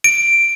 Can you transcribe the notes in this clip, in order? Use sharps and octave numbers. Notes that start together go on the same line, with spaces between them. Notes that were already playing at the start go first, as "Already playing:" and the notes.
D7